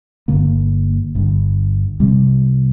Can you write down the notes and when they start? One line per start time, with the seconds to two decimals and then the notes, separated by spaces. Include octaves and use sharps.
0.28 G1 G2 D3 A#3
1.15 G1 G2 D3
2.00 C2 C3 G3